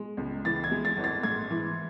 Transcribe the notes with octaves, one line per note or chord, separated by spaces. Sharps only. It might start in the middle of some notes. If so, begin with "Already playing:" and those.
Already playing: G#3
C#2
E3 A6
G#6
G#3
A6
G#1
A6
G#2 G#6
E3